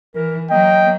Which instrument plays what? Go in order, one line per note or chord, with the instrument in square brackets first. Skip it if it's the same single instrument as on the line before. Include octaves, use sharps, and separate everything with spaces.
[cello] E3 [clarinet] A#4
[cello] F#3 A#3 [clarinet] D#5 [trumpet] G5